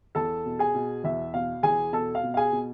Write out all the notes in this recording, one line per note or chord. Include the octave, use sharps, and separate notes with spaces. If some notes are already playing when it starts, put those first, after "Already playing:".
E2 A4 A5
B2
G#4 G#5
B2
E2 E5
B2 F5
E2 G#4 G#5
B2 A4 A5
F5
B2
F5
G#4 G#5
B2